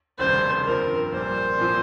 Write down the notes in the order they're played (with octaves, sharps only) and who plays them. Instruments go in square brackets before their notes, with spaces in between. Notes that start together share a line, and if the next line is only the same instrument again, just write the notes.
[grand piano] F1 D#2 C#3 G3 [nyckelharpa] C5
[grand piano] G2 F3 C4 [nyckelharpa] A#4
[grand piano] A#1 A#2 G3 [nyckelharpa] C5
[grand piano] A#2 F3 C4 F4